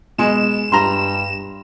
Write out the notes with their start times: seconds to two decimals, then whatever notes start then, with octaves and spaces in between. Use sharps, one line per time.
0.18 B2 G#3 E7
0.72 G2 A#5 C6